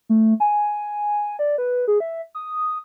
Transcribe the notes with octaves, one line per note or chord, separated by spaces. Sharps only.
A3
G#5
D5
B4
G#4
E5
D#6